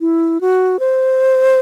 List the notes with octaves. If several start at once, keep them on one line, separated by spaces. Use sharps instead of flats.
E4
F#4
C5